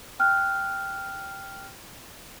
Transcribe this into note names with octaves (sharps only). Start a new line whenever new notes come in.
G5 F6 F#6